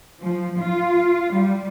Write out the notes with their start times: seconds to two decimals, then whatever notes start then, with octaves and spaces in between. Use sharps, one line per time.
0.20 F3
0.59 F4
1.32 G3